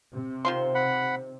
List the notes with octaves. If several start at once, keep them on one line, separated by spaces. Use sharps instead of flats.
C3
D#3 F4 C5 C6
F#5 B5